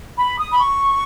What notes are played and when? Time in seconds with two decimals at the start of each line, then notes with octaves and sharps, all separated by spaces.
0.18 B5
0.39 D#6
0.51 B5
0.59 C#6